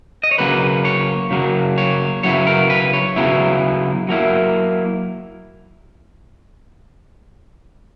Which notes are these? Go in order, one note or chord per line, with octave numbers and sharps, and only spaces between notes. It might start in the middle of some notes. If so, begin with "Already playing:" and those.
D#5
C#5
C#3 F#3 A#3 B4
C#5
C#3 F#3 A#3
C#5
C#3 F#3 B3 E4 C#5
A#4
B4
C#5
C#3 F#3 B3 E4
F#3 A#3 E4